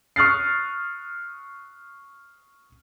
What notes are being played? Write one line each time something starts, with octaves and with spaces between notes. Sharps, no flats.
C#6 D#6 F6 F#6 A6 C7